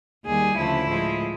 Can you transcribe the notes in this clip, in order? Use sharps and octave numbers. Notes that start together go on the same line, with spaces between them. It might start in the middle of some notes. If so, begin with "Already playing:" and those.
D#2 D#3 G3 G#4
D2 C#3 F3 A3 E4
A2 F3 G#3